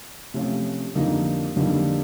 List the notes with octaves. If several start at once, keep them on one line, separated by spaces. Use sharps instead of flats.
C3 F3 A3 C#4 F4
F2 D3 G3 A#3 D#4
F2 D3 G3 A#3 D#4